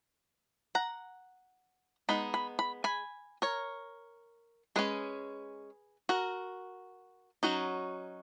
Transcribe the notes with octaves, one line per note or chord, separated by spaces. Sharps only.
F#5 A#5
G#3 B3 D#4 B5
B5
B5
G#5 B5
A#4 C#5
G#3 C#4 G#4 B4
F#4 A#4
F#3 C#4 D#4 F#4